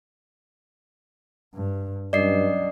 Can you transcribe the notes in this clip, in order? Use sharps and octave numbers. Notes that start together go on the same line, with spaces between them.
G2
G2 F#3 C#4 D5 D#5 C7